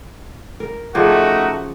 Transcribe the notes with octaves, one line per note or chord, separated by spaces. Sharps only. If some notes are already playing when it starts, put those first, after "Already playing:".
A#4
C#3 F3 A3 D#4 F#4 G4